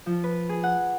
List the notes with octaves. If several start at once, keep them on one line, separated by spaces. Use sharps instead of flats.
F3
B4
G#4
F#5